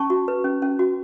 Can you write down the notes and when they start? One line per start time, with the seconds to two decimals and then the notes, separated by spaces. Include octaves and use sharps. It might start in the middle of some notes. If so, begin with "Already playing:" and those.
Already playing: C#4 A5 C#6
0.10 F#4
0.28 B4
0.44 C#4
0.62 C#4
0.79 F#4